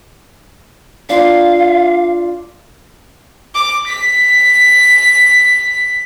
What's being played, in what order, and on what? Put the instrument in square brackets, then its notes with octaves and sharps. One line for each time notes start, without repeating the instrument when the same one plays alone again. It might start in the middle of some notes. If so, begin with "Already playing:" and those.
[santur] D4 F4 [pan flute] F5
[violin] D6
B6